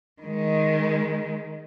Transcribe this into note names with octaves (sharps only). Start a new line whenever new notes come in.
D#3 G#3